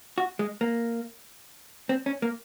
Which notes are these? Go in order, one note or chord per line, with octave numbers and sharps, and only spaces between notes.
F#4
G#3
A#3
C4
C#4
A#3